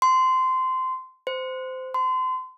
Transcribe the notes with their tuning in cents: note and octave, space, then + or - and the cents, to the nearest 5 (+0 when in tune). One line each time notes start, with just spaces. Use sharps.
C6 -15
C5 -20
C6 -30